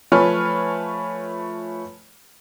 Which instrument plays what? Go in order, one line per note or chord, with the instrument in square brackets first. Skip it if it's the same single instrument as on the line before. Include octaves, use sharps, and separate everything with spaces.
[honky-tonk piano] F3 A3 B4 C#5 G#5 F6